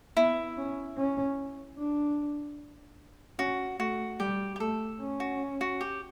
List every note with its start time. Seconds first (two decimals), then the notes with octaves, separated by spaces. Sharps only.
0.16 B3 E4
0.57 C#4
0.97 C#4
1.78 D4
3.38 C#4 F#4
3.79 A3 F#4
4.20 G3 G4
4.56 G4
4.60 A3 A4
5.00 C#4
5.20 F#4
5.61 F#4
5.81 G4